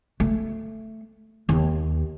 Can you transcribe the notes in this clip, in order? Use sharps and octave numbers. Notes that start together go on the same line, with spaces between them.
A3
D#2